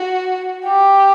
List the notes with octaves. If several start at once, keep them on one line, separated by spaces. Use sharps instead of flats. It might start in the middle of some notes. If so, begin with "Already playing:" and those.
Already playing: F#4
G4